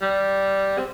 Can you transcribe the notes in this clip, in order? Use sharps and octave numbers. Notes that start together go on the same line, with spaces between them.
G3
C4